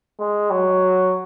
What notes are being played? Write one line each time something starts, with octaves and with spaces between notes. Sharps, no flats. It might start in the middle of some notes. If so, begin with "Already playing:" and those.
G#3
F#3